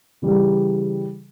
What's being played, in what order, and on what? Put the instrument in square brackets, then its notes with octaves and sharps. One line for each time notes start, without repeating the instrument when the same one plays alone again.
[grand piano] C#3 E3 G3